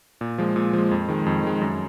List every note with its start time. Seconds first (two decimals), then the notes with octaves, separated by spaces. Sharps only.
0.21 A#2
0.38 F3 G#3
0.56 A#2
0.73 F3 G#3
0.91 F2
1.09 D#3 G#3
1.26 F2
1.44 D#3 G#3
1.61 F#2